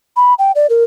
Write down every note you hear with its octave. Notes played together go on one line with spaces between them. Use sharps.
B5
G5
D5
A#4